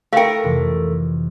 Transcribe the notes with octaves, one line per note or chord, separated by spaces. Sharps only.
A3 E4 A#4 F5 G5
F2 C3 E3